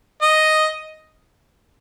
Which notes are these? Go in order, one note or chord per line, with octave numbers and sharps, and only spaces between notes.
D#5